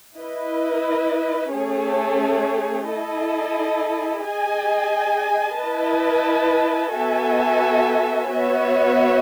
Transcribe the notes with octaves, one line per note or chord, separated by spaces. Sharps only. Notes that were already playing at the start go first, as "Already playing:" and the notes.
E4 B4 D#5
A3 C#4 G#4 C#5
E4 A4 D#5
G#4 D#5 G#5
E4 B4 D#5 A5
B3 F#4 A4 E5 G#5
B3 F#4 C#5 E5